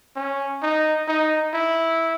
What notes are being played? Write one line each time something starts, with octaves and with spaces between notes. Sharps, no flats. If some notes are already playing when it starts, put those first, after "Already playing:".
C#4
D#4
D#4
E4